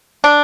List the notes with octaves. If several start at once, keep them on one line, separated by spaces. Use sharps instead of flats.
D4